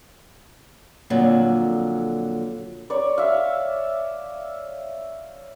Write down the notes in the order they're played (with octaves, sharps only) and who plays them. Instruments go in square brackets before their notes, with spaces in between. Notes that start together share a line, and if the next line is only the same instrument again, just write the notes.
[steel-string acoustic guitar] F2 A#2 D3 F#3
[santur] C#5 D5
E5 F5